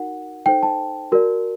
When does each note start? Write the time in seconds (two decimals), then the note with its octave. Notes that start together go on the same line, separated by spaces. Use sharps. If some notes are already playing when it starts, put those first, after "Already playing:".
Already playing: D#4 F#4 A#4 F#5
0.46 D#4 A4 C5 G5
0.63 A5
1.12 F#4 A#4 D5